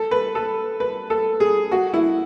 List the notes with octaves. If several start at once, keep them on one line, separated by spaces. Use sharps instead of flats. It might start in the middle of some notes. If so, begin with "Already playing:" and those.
Already playing: A4
B4
A4
B4
A4
G#4
F#4
E4